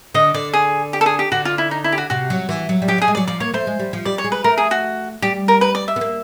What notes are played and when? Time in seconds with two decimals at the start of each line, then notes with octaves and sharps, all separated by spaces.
0.14 D3 D#5
0.34 D3 D5
0.53 G#4
0.93 G4
1.01 A4
1.06 G#4
1.19 G4
1.32 D3 F#4
1.45 F4
1.58 E4
1.71 D#4
1.84 E4
1.92 G4
1.98 F#4
2.10 C3 F#4
2.30 F#3
2.49 E3
2.69 F#3
2.82 G3
2.88 F#3 G4
2.98 G3 G#4
3.08 G#3
3.15 F#3 D5
3.27 F3 D5
3.40 A#3 C#5
3.54 A3 C5
3.67 G#3
3.79 G3
3.93 F3
4.05 G3 D5
4.18 C#5
4.24 G#3
4.32 B4
4.44 A3 A#4
4.58 G#4
4.71 F#4
5.22 G3 G4
5.48 A#4
5.61 B4
5.75 D5
5.88 E5
5.96 B3
6.01 A#3